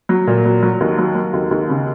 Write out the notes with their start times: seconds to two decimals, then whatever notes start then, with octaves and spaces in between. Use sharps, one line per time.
0.09 F#3
0.27 A#2
0.45 F#3
0.63 F#3
0.80 D#2
0.98 F#3
1.15 F#3
1.33 D#2
1.51 D#2
1.69 C#3